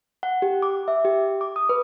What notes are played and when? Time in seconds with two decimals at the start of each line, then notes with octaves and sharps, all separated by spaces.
0.23 F#5
0.42 G4
0.63 D6
0.88 E5
1.05 G4
1.41 D6
1.56 D#6
1.69 B4